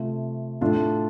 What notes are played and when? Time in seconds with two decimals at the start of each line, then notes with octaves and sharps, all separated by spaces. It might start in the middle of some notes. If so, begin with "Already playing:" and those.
Already playing: C3 A3 F4
0.61 A2 A3 D4 F4